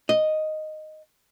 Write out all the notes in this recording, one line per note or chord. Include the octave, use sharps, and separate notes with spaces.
D#5